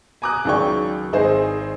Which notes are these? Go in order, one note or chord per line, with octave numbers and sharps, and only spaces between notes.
G#5 A#5 D6 D#6 F#6
C#2 D#3 F#3 D5 G5 C#6
G#1 D#4 G#4 C5